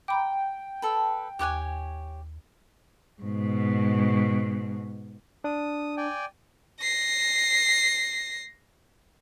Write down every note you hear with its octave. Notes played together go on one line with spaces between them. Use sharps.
G5 A#5 B5 D6
A4 B4
D#2 G4 C#5 G#5 D6 F#6
G#2 B2
D4 D#6
D5 G5 G#5
A#6 C7